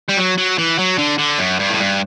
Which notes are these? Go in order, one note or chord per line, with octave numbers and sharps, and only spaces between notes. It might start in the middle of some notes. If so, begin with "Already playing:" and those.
G3
F#3
F#3
E3
F#3
D3
D3
F#2
G2
A2
G2